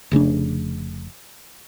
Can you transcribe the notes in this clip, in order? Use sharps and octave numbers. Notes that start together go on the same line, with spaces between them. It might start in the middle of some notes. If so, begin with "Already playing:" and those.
F1 C#3 A3 D4